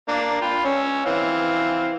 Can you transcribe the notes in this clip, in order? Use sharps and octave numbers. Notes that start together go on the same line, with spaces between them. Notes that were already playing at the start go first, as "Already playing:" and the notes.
A#3 D4
F4 G5 B5
C#4 E6
E3 C4 F5